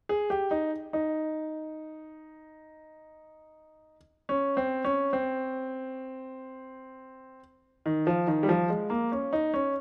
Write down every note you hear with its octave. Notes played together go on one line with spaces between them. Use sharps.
G#4
G4
D#4
D#4
C#4
C4
C#4
C4
D#3
F3
D#3
G3
F3
G#3
A#3
C#4
D#4
C#4